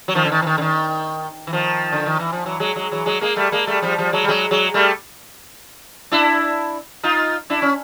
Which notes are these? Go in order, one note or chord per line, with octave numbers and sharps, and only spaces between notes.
F#3
D#3 F3
D3
D#3
E3
D#3
D3
D#3
E3
D#3 F3
D3
D#3
E3
F3
E3 F#3
F#3 G#3
F#3 G#3
E3 F#3
F#3 G#3
G#3 A#3
G3 A3
G#3 A#3
G3 A3
F3 G3
F3 G3
F#3 G#3
G3
F#3 G#3
F#3 G#3
G3 A3
D4 E4
D#4 F4
D4 E4
C#4